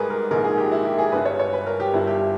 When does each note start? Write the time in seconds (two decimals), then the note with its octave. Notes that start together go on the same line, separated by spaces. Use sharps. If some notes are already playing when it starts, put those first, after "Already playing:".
Already playing: G#1 G#2 G3 G#4 A#4 B4
0.10 A#4
0.31 A#1 G#2 D#3 G#3 A#4
0.44 G#4
0.58 G4
0.71 E4
0.85 G4
0.98 G#4
1.12 G1 G2 G3 B4
1.25 C#5
1.39 C#5
1.53 B4
1.66 A#4
1.80 G4
1.93 G1 G2 G3 E4
2.07 G4